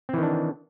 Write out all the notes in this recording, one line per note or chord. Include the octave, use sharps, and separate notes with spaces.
D#3 E3 C4 D4